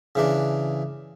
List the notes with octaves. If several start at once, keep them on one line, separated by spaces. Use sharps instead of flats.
C#3 E3 D4